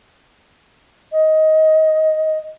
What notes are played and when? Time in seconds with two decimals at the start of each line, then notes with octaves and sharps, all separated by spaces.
1.12 D#5